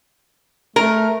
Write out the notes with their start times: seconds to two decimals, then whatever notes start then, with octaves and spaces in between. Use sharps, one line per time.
0.76 A3 A#4